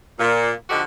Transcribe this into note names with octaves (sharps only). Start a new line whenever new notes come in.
A#2
D3 F3 D#4 F#4 G4 A4